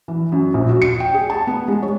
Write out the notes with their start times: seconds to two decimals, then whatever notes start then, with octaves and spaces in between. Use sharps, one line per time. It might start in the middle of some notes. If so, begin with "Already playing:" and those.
0.08 E3
0.32 F#2
0.54 A#1
0.69 F#4
0.82 C#7
1.00 G5
1.14 G#4
1.30 A5
1.47 B3
1.68 G#3
1.82 C#5